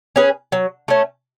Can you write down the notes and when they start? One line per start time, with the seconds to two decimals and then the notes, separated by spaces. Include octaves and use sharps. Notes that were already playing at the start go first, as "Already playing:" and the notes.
0.16 C#4 G#4 B4
0.52 F#3
0.88 A3 C#4